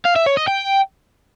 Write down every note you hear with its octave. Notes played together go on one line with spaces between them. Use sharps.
F5
E5
C#5
D#5
G5